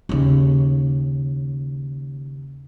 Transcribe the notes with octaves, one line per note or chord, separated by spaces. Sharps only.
D#2 C#3